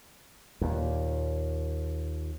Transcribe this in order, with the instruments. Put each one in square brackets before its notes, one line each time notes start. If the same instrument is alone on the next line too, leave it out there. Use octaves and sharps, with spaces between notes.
[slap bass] D#2 A#2